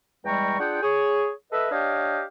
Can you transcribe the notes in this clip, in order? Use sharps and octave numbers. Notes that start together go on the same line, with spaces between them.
E2 G3 G#3 G5 A#5 C#6
D4 F4 G#4 F#5 G5
G#4 C#5
A4 B4 D#5 E5
D4 G4 C#5 D#5 F5 G5